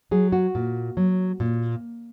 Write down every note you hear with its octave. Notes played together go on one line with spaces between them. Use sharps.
F#3 G#4
F#4
A#2
F#3
A#2